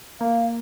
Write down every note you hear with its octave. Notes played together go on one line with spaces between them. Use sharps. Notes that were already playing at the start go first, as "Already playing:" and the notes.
A#3 F5